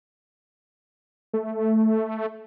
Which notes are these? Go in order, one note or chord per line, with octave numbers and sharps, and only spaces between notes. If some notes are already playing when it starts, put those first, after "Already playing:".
A3